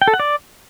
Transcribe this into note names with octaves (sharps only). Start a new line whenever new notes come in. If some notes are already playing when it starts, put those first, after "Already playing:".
G5
A4
F#5
D5